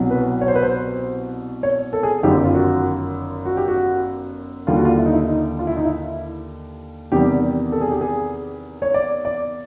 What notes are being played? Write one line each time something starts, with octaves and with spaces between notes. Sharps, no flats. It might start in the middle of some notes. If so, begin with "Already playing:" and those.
Already playing: C2 B2 F#3
B4
C#5
C5
B4
C5
C#5
A4
G#4
G1 F#2 D#3 G4
F4
F#4
F#4
G4
F#4
D#2 D3 G3 F4
F#4
F4
E4
D#4
E4
D#4
F4
E4
D#4
E4
E2 C3 D#3 G3 G4
A4
G#4
G4
G#4
C#5
D5
D5